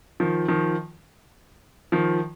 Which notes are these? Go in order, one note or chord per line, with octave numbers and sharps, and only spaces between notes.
D#3 F3
D#3 F3
D#3 F3